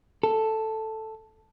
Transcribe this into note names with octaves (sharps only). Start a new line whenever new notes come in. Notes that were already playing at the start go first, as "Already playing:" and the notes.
A4